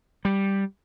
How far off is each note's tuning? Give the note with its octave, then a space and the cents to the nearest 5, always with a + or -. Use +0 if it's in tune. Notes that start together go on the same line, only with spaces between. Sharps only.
G3 +0